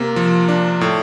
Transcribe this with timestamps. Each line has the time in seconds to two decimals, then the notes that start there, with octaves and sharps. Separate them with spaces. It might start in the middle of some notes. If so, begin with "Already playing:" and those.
Already playing: C3 A#3
0.16 F3
0.48 D4
0.81 A2